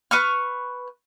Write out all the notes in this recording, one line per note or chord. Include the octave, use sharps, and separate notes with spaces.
B4 C#6 F6